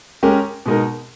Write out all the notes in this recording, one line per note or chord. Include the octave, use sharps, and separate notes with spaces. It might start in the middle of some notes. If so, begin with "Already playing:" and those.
G#3 C#4 G4 A#4
B2 G#3 D#4 A#4